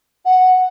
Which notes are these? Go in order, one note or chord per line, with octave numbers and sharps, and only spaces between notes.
F#5